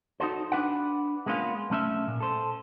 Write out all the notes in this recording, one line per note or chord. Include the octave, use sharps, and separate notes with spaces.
D#4 F#4 A4 C5
D4 B4 F#5
G#3 A#3 B3 C#4 F4
B1 A3 C#4 E5
A#2
A4 C5